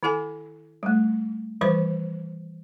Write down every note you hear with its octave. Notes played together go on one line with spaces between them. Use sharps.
D#3 E4 A4 F#5 G#5
G3 A3
D#3 E3 G3 B4 C5 D6